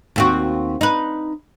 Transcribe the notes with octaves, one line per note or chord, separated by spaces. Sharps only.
D#2 C4 F#4
D#4 B4